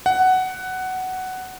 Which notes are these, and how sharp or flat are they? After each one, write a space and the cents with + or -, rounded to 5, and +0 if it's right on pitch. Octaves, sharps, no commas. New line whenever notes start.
F#5 +10